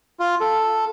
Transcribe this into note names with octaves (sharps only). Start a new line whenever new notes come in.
F4
A4